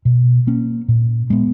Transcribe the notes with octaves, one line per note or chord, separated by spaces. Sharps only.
B2
A#3 C#4
A#2
G#3 B3